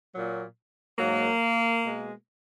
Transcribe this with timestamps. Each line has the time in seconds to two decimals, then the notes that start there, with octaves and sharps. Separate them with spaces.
0.14 A#2 F#3
0.98 G#2 F#3 A#3
1.83 B2 G#3